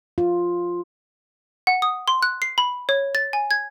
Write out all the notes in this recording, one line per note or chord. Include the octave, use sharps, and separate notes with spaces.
F4
F#5
D#6
C6
F#6
C7
B5
C#5
A6
G#5
G#6